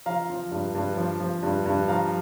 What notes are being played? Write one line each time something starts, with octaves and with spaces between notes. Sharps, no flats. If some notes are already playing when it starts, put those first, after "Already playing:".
F3 F5 A#5
F3
G2
G2
F3
F3
G2
G2
F3 F5 A#5